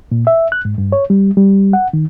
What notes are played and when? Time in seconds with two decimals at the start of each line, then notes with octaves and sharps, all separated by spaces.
0.12 A#2
0.27 E5
0.52 F#6
0.65 G#2
0.78 G2
0.92 C#5
1.10 G3
1.37 G3
1.73 F#5
1.93 D#3